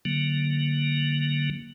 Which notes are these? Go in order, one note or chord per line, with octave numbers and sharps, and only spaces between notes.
D3 F#3 A#3